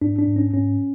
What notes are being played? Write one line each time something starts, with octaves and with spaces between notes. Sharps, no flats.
G#2 D4
D4
G#2
C#4
G#2 C#4